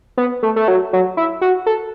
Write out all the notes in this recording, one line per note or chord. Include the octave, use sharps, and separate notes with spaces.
B3
A3
A3
F#3
F#3
E4
F#4
A4